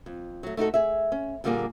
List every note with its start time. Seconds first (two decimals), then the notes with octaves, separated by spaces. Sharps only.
0.06 F2
0.43 F#3 A3
0.57 A3 D#4 F#4 A4
0.74 G#4 E5
1.12 C#4
1.44 A#2 D3 G3 A#3 F4 G#4